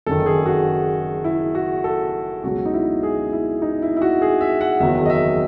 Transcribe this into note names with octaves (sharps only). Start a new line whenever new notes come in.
F#1 F#2 D#3 A4
G#4
F#4
E4
F#4
A4
C#2 B2 F#3 F#4
D#4
E4
G#4
E4
D#4
E4
E4
F#4
G#4
E5
F#5
F#1 E2 D#3 F#3 E5
D#5
E5